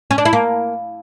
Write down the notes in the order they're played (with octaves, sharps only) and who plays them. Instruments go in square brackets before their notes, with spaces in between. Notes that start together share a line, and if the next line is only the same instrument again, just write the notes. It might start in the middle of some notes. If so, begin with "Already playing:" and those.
[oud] C#4
D4
E4
A#3